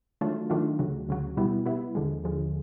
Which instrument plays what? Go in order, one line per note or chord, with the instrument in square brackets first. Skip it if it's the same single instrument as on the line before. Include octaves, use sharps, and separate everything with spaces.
[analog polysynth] D#3 F#3 A3 D4 F4
D#3 F#3 A3 D4 F4
D2 C#3 F#3
D2 C#3 F#3
B2 G3 B3 E4
B2 G3 B3 E4
D#2 D3 F3 G#3
D#2 D3 F3 G#3